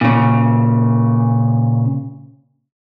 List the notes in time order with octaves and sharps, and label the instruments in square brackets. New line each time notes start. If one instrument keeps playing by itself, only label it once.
[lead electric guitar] A#2 C#3